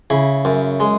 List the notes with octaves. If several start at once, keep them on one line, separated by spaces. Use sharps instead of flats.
C#3 E4
F#2
G#3